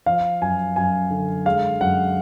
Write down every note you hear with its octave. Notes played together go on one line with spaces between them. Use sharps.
F3 F5
F#2 G#5
F#2 G#5
D3
G#3 F5
F#2 F#5